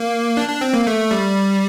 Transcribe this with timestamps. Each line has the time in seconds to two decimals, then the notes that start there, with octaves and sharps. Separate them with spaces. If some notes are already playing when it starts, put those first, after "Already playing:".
Already playing: A#3
0.37 D4
0.49 D4
0.61 C4
0.74 A#3
0.87 A3
1.11 G3